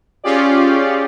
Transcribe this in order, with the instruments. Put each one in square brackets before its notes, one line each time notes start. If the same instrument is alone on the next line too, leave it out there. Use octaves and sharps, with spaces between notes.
[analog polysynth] C#4 F4 G4 G#4 D5